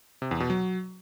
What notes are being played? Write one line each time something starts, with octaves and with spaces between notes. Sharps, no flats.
C3
E2
B2
F#3